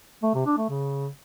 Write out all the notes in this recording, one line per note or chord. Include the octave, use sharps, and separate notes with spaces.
A3
C3
D4
A3
C#3